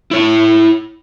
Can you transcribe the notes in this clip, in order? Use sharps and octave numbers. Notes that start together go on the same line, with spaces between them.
E4 C#5